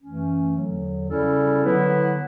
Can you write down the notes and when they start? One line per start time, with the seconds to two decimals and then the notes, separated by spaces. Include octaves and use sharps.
0.01 F#2 E3 A3 C#4
0.56 E2 D3 F#3
1.08 C#3 G3 C#4 E4 A4
1.62 D3 F#3 B3 E4 B4